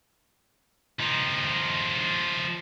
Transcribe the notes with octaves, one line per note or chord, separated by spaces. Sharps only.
F3 D#4